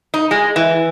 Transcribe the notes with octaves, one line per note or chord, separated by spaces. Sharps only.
D#4
G#3
E3